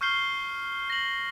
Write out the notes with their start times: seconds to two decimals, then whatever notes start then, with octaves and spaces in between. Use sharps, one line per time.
0.01 C#6 F6 G6 C7 G7
0.90 A#6 F#7